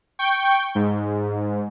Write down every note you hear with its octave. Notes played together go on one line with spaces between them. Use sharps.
G5 C#6 G6
G#2